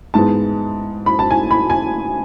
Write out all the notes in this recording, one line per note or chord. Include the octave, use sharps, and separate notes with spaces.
G#2 E3 G#3 B3 A5
B5
A5
G#5
B5
G#5